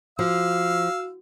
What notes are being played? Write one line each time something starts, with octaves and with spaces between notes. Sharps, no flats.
F3 F#4 F5 E6